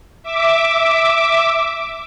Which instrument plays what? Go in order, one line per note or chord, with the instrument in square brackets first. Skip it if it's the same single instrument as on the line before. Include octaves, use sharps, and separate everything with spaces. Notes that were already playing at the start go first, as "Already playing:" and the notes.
[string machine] E5 D6